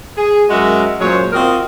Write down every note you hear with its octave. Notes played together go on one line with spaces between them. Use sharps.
G#4
F#2 F#3 G#3 F#4 A#4 E5
F#2 A#2 F#3 G#3 C5 C#5
C4 F4 F#4 A#4 D#5